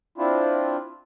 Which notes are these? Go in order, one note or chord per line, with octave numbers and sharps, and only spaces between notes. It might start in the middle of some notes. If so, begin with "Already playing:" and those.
C4 D4 E4 F4